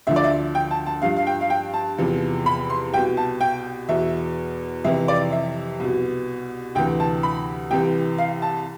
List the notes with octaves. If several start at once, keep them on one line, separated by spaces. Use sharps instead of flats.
D2 D3 F3 E5
D5
E5
G5
A5
A5
G2 F3 F5
F5
G5
F5
G5
A5
E2 C3 F3
B5
C6
C2 B2 G5
A5
G5
E2 B2 E5
F2 C3 E3 E5
D5
E5
C2 B2
D2 C3 E3 G5
A5
B5
C2 C3 E3 G5
F5
A5